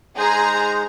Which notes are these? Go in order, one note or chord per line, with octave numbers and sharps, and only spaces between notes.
G#3 D#4 G#4 C5 A#5